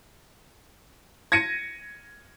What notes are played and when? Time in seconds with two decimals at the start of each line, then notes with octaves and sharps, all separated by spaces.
1.32 G#6 A#6 C#7 D#7